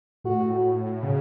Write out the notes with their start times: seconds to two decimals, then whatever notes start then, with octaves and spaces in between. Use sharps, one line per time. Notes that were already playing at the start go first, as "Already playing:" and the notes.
0.24 A2 F#4
1.03 C#3